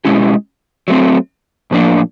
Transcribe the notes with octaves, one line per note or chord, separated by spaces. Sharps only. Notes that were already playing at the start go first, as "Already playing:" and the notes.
B2 G#3 C#4 E4 G4
F#3 A3 C4
A2 F3 A#3 D4